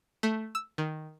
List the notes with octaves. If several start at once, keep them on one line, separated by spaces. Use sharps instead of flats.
A3
E6
D#3